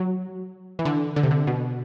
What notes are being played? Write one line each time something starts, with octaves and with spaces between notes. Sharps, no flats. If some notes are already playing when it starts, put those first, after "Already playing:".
Already playing: F#3
E3
D3
D3
C3
D3
B2